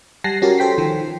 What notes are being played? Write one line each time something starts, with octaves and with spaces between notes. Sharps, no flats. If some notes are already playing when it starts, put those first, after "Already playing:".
G3 F#5 G#5 A5 A#6 C7
C#4 F#4 G4 A#4
A4 C5 G5 B6 C7
D#3 F3